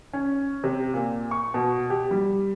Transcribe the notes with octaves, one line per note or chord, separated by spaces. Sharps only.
C#4
C3
A#2
C#6
B2
G4
G3